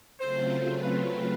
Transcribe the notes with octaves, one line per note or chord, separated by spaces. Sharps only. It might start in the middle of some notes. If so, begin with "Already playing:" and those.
C#3 F#3 A3 C4 F4 C5
B4